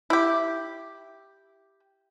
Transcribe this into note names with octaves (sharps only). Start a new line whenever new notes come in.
E4 G4